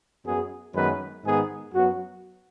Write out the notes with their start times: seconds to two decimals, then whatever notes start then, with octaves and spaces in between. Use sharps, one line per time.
0.24 F#2 F#3 B3 G#4
0.73 F#2 D#3 G#3 B3 B4
1.24 G#2 D#3 B3 G#4
1.73 F#2 F#3 B3 F#4